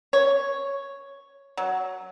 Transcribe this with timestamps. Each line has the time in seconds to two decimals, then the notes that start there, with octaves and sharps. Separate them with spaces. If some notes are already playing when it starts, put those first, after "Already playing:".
0.13 C#5
1.57 F#3